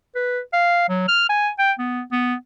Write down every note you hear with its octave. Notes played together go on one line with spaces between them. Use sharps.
B4
F5
F#3
F6
G#5
G5
B3
B3